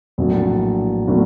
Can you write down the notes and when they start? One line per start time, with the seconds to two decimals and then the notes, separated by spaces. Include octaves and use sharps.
0.18 A#1 A2 F#3 A#3 D4
1.07 A2 F#3 A#3 D4